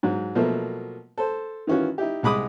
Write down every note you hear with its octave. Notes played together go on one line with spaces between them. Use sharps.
G#2 F#3
B2 F3 F#3 A3 A#3
A4 C5
D#3 E3 C#4 F4 F#4
D#4 E4 G4
C2 G#3 B5 D6 D#6